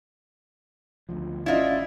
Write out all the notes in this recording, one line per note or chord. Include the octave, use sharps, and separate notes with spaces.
D2 F3
G#1 C#4 D4 E4 F4 D#5